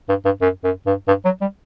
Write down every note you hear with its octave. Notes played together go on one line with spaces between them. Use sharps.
G2
G2
F#2
F#2
G2
G2
F#3
G3